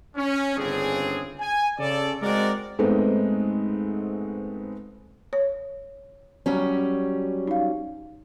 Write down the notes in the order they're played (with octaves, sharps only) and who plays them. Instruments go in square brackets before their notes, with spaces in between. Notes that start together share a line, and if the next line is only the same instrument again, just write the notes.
[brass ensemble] C#4
G1 C#3 C4 D4 G#4
G#5
C#3 A4 D5
G#3 C4 F#4 A#4 D5
[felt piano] G#2 G#3 A3 B3 C4 D#4
[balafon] C#5
[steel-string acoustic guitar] F#3 G3 C#4
[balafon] D#4 F5